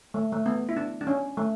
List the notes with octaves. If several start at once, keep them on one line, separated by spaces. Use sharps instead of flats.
A3
A3
B3
E4
D4
D4
C#4
A3